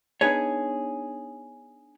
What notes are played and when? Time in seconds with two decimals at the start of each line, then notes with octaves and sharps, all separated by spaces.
0.21 B3 D4 D#4 G#4 B4 C#5